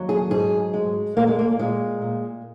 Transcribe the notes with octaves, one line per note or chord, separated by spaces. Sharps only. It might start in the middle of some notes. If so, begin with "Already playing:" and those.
Already playing: D#2 F#3
G#4
G#2 G#4
G#3
A#2 A#3
G#3
A#3
A#2 G#3
A#2